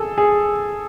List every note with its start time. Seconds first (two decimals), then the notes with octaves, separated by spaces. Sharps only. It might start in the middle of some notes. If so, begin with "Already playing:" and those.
Already playing: G#4 A4
0.18 G#4